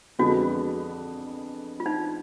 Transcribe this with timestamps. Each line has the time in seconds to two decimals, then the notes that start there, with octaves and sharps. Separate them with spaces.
0.19 F2 D3 G#3 B3 F#4
1.80 F4
1.86 D#4